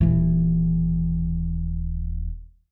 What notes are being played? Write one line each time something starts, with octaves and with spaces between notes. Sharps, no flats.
D#1 E3